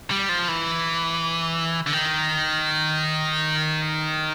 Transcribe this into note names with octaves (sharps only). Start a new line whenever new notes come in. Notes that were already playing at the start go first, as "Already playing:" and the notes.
G3
F3
E3
D3
D#3